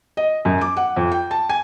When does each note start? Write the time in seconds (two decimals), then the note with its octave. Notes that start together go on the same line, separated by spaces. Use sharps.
0.17 D#5
0.45 F#2
0.61 D6
0.77 F#5
0.96 F2
1.12 G5
1.31 A5
1.49 G#5